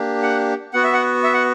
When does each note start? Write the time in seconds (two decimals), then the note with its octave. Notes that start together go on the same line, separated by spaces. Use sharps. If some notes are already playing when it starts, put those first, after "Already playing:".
Already playing: A#3 D4 G4
0.23 F#5
0.73 B3 F#4 F#5
0.84 E5
0.93 F#5
1.24 E5
1.34 F#5